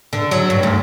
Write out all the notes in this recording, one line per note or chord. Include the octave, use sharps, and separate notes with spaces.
D3
F#3
G2
D2